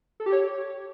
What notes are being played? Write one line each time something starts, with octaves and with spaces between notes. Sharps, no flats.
A4
G4
C#5